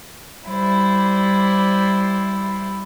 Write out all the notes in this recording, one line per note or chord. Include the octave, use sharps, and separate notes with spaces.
G3 E4 C5